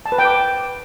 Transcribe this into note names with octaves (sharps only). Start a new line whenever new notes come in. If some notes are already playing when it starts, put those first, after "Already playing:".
A5
B4
G5
D6